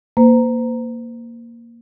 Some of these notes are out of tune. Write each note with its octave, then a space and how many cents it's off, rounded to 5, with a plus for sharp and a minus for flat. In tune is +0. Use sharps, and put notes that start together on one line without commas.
A#3 +0 C5 -40